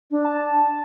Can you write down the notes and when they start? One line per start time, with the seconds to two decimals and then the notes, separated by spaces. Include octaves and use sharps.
0.11 D4
0.24 A5